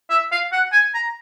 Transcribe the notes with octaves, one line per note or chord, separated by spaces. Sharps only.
E5
F5
F#5
G#5
A#5